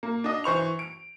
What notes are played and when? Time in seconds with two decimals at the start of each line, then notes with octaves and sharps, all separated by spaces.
0.03 A#3
0.24 D4 D#5
0.44 E3 C5 C#6 F7
0.79 D7